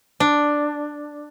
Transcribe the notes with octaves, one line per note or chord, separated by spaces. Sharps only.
D4